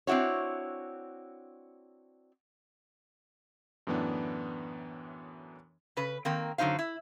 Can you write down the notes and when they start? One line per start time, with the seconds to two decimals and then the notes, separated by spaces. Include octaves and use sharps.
0.07 C4 D4 E4 F#4 C#5
3.87 F#2 A2 E3 B3 D4
5.97 C#3 B4
6.25 D#3 A#3 C4
6.58 F#2 D3 F#3 D#4 C5 F5
6.79 E4